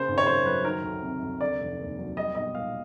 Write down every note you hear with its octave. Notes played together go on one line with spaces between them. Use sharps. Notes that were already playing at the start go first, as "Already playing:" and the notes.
Already playing: C#3 A#3 C5
G#1
C#5
F#2 C5
F#3 B4
D#3 A#4
D2
C3
D2
D3 D5
F1
D#2
F#3
G3 D#5
B1 D#5
A#2 F5